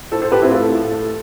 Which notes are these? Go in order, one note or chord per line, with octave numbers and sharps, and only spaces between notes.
A2 A4 C5
A4 C5
A2 G4 B4
C4 E4
A3 F4 A4
A2
A3